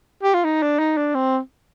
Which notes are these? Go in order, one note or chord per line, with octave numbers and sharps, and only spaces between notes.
G4
F4
D#4
D4
D#4
D4
C4